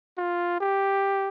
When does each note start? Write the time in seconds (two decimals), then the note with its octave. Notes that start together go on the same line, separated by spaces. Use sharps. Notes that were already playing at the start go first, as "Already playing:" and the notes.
0.18 F4
0.61 G4